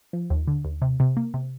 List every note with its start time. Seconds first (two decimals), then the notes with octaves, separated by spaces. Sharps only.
0.13 F3
0.30 D#2
0.48 D3
0.65 D#2
0.82 C3
1.00 C3
1.17 A#3
1.34 C3